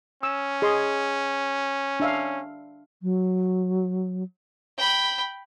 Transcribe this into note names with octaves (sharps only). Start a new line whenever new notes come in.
C#4 E6
G#4 D#5 C6
D4 E5 F5
F#3
G5 B5